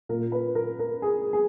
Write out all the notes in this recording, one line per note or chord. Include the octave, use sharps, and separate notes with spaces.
A#2 A#4
B4
A#4
A#4
G#4
G#4